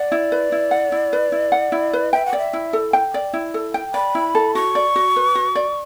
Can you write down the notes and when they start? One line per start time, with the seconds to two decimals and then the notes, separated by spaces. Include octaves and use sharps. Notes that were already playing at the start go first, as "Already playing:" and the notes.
Already playing: D5 F#5
0.12 E4
0.32 B4
0.52 E4
0.71 F#5
0.92 E4
1.13 B4
1.32 E4
1.52 F#5
1.72 E4
1.93 B4
2.13 E5 G5
2.25 F#5
2.33 D5
2.38 E5
2.53 E4
2.73 A4
2.93 G5
3.14 D5
3.33 E4
3.54 A4
3.74 G5
3.94 D5 B5
4.15 E4
4.35 A4
4.55 F#4 C#6
4.75 D5
4.96 F#4
5.16 B4
5.35 F#4
5.55 D5